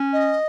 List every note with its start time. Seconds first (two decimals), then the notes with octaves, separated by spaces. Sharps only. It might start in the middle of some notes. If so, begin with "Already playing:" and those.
Already playing: C#4
0.13 D#5